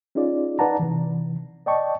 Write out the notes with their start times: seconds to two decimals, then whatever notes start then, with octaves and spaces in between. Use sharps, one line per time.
0.15 C#4 D#4 F4 G#4 D5
0.59 D#4 B4 D5 F#5 A5 A#5
0.79 C3 E3
1.66 D5 D#5 G5 A5 C#6